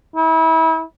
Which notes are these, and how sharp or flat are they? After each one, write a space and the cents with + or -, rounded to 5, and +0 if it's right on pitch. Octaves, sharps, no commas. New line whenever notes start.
E4 -35